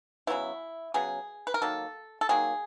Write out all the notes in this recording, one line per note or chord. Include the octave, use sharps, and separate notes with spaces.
C#3 F#3 B3 E4
C#3 F#3 B3 G#4
B4
A#4
D#3 F#3 A#3 A4
A4
D#3 F#3 A#3 G#4